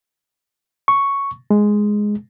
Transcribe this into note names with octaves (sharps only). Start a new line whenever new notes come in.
C#6
G#3